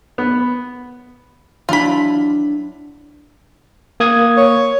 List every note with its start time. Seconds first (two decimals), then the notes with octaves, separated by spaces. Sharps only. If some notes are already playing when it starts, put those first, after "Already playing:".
0.18 B3
1.69 F#3 D4 E4 F4 B5
4.00 A#3 D#6 G#6
4.37 C#5